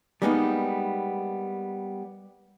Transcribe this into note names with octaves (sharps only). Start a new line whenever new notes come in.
G3 G#3 A#3 B3 D4 D#4